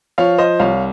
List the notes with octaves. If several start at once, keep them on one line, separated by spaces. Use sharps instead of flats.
F3 C#5 F5
C5 D#5
C2 C#5 F5